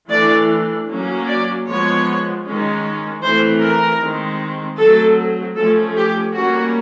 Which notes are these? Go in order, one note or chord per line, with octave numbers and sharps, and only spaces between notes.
E3 A3 D4 D5
F#3 A#3 C#4
D5
F3 G#3 B3 C#5
D#3 G#3 C#4
E3 A3 C4 C5
A#4
D#3 G#3 C4
F#3 A3 C4 A4
F3 A3 C#4 A4
G4
G3 A#3 C#4 F#4